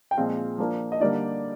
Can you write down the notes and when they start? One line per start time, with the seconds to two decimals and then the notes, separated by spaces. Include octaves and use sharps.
0.11 G5
0.17 A#2 F3 G#3 C4 F5
0.58 F3 A#3 D4
0.92 D#5
1.00 D3 G3 A#3 D#4 D5